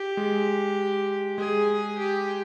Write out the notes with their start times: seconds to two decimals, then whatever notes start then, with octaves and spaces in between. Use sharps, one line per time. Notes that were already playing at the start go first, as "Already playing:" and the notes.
Already playing: G4
0.17 G#3
1.38 G#3 G#4
1.98 G4